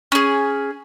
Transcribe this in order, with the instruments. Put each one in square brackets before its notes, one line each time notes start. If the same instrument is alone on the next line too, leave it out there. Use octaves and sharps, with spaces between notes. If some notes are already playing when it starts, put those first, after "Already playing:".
[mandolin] C#4 G#4